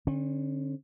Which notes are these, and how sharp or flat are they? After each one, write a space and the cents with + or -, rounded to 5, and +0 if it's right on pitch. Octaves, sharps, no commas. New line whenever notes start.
D3 +0 C#4 -40